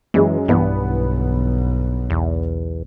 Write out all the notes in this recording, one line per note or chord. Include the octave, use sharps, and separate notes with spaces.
F#2 E3 G#3
B1 G2 E3 B3
E2